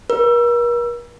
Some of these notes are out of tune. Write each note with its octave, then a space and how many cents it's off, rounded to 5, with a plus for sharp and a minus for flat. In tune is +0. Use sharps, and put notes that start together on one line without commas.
A#4 +45